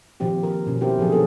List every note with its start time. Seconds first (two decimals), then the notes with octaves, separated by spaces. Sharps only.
0.20 A#2 D#3 F3 C4 G4
0.43 A#4
0.67 B2 C#4
0.81 B3 E4 G4 A#4 C5
0.98 A#2 D3 F3 F#3 G#4
1.12 B3 C4 A4 A#4 C#5